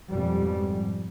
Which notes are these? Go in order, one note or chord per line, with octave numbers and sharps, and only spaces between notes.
F2 G#2 B2 G3